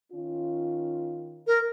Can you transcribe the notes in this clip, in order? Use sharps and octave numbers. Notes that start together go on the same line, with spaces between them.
D#3 C#4 F4
A#4